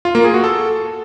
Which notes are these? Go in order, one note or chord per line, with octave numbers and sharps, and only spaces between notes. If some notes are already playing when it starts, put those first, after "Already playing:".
F4
A#3
G#4
F#4
A4